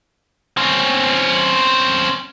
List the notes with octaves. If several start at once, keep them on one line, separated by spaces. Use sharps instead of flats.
C4 C#4